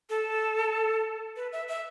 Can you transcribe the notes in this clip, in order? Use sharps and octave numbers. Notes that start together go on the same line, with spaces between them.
A4
B4
E5
E5